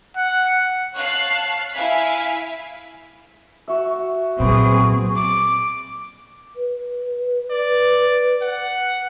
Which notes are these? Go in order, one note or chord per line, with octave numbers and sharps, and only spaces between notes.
F#5
C#5 F5 A5 F#6 C7
E4 F5 G#5 B6
F#4 E5
A#2 F#3 B3 C4 G#4 C#6
D6
B4
D5
F#5